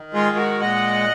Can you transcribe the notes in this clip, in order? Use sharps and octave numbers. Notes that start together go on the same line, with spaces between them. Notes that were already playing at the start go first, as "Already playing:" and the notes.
Already playing: D#3
G#3 F4 G#4
F#4 A#4
A#2 D#5 F#5